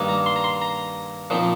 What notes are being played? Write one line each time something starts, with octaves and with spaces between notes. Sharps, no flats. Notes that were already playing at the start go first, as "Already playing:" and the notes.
Already playing: G2 D#3 A#3
A#5
C6
A#5
C6
A#5
A#2 F3 C4 D#4